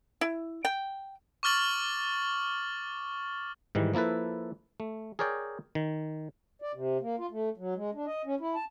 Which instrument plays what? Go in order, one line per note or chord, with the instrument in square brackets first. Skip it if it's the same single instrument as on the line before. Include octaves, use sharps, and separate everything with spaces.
[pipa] E4
G5
[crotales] C#6 D6 F6 A6 F#7
[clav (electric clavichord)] G#2 D#3 E3 G3
F3 A#3 E4 A4 B4
A3
G#4 A#4 C#5 D5 G5
D#3
[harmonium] D5
C3
A#3
F4
A3
F#3
G#3
D4
D#5
C#4
E4
A5